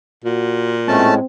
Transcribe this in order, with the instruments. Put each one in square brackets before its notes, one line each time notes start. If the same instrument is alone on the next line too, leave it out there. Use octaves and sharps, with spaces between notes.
[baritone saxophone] A#2 [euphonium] F#4
[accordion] A2 G#3 [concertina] A3 C#4 A5 [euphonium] C4